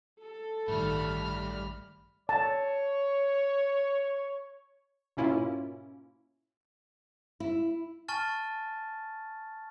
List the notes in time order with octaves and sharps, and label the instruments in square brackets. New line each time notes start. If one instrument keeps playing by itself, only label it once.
[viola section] A4
[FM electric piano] A1 G2 D#3 [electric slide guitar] G3 A3 [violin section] B5 F6
[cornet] C#5 [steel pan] A5
[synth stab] G#2 B2 A#3 C#4 E4 F4
[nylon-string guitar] E4
[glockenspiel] G#5 A5 C#6 F6 A6